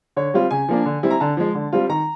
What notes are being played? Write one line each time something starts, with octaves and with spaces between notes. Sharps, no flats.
D3 C#5
G3 C4 F4
C#3 G#5
F3 A#3 D4
D3
G3 C4 E4
A#5
D3 A5
F3 G#3
D3
G3 C4 F4
D#3 A#5